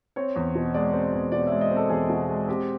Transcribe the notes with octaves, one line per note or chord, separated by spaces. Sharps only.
C4 C#5
E2
B2
G#3 D5
C4
E2
B2 D5
G#3 E5
D#5
C4
A4
E2 G#4
B2
G#3
C4 G4